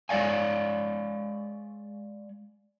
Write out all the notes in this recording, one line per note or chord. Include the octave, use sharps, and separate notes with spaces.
G#3 C#5 D5 F5 G#5